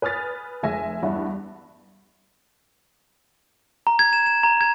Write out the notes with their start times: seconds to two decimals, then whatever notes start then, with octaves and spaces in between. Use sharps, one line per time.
0.02 B4 G#5 D#6 F6 A6 B6
0.63 F1 G#3 E5 G#5 A#6
1.02 E2 G2 E4 F#5
3.87 A#5
3.99 G#6
4.13 E7
4.26 E7
4.43 A#5
4.61 G#6